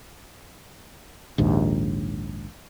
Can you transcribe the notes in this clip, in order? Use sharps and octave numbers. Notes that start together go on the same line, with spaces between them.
A#1 D#2 G#2